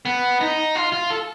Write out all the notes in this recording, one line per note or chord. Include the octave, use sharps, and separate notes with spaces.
B3
D#4
F4
F4
A4